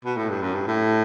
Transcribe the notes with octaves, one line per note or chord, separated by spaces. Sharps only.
B2
A2
G2
F#2
G2
A2